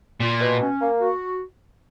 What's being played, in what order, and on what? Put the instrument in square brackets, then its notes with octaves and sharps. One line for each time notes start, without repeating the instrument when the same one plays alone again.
[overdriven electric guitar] A#2 [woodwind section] F4
[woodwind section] B2
C#4
A#3
F#4